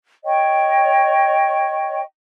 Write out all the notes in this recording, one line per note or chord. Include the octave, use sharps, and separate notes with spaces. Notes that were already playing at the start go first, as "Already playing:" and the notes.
C#5 D#5 G5 C#6